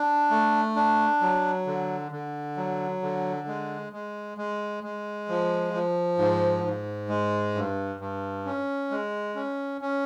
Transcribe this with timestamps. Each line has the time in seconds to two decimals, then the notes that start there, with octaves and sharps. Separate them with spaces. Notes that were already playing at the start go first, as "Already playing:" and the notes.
Already playing: D4
0.30 A3
0.76 D4
1.21 F#3
1.67 D3
2.12 D3
2.57 F#3
3.02 D3
3.48 G#3
3.93 G#3
4.38 G#3
4.84 G#3
5.29 F3
5.74 F3
6.18 G#2
6.64 G#2
7.09 G#3
7.55 G2
8.00 G2
8.45 C#4
8.91 G#3
9.35 C#4
9.81 C#4